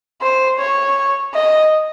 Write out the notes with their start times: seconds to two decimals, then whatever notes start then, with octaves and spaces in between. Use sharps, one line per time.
0.21 C5
0.59 C#5
1.34 D#5